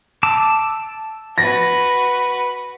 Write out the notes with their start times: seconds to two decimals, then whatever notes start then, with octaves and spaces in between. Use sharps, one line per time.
0.23 A5 D6 E6
1.38 F#4 B4 A#6